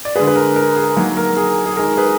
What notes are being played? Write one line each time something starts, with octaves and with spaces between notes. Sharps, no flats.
D5
D3 G#3 G#4 B4
B4
A#4
A#4
G#4
D#3 F#3 A#3
A#4
G#4
G#4
D#3 G#3 A#4
G#4 B4